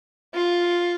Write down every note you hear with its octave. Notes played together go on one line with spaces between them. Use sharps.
F4